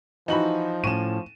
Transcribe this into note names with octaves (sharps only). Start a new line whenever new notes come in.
E3 F3 D#4 F#4 B5 F#7
A2 C#4 C#6 D#7 E7